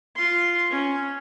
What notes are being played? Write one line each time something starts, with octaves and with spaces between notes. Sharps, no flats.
F4 C6
C#4